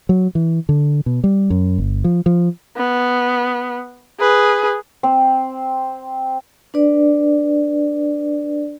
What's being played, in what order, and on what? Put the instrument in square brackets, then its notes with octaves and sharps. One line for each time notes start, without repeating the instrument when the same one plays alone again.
[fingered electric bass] F#3
E3
D3
B2
G3
F#2
G1
F3
F3
[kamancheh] B3
G#4 B4
[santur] C4
[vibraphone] D4 B4 D5